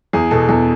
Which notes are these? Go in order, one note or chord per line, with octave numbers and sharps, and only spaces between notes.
E2 G#4
B2 A4
E2 A4